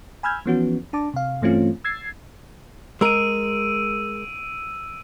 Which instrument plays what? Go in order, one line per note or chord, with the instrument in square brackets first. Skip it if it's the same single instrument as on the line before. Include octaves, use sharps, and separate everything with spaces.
[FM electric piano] G#5 B5 E6 F6 G6 G#6
E3 F3 B3 C#4 F#4
D4 A5 D6
C3 F5
G2 E3 A3 C4 C#4 F4
E6 G#6 A6 C7
[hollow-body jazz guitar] G#3 A#4 [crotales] E6 D7 D#7